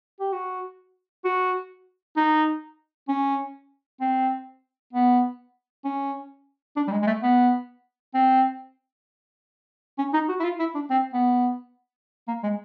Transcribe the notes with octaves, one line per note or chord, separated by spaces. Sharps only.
G4
F#4
F#4
D#4
C#4
C4
B3
C#4
D4
G3
G#3
G#3
A3
B3
C4
C#4
D#4
F#4
E4
F4
E4
D4
C4
B3
A#3
G#3